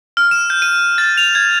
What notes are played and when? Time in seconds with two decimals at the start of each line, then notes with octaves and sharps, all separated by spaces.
0.17 F6
0.31 E7
0.50 G6
0.62 D#7
0.98 A6
1.17 F7
1.35 G#6